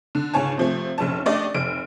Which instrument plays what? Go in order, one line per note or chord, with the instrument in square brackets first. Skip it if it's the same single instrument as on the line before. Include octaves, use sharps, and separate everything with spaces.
[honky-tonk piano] D3
C#2 G#2 D3 C#5 G#5 A5
C3 F3 A3
F1 A#1 C#4 A5
A3 D4 G4 D5 D#5
F1 D7